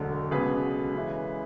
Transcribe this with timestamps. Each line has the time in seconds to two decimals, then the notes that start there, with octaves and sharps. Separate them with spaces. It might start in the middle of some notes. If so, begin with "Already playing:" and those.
Already playing: E1 D2 D3 F#3
0.31 C#2 B2 F#3 G#4 B4
0.95 C#2 C#3 E3